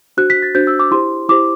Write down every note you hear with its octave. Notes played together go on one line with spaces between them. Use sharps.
D4 F#4 C5 F#6
B6
A6
D4 F#4 C5 G6
E6
D6
E4 G4 C5 C6
E4 G4 C5 D6